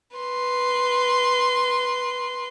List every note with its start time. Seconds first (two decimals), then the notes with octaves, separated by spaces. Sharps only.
0.17 B4 C6